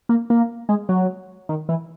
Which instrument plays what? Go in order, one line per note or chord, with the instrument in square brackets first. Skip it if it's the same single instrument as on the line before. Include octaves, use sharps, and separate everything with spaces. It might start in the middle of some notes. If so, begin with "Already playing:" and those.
[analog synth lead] A#3
A#3
G#3
F#3
D#3
E3